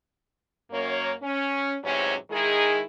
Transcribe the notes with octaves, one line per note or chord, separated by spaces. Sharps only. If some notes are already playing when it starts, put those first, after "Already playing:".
F#2 A#3 C#5
C#4
E2 G#2 C3 F#3 C#4
D#3 G#3 D#4 E4 G#4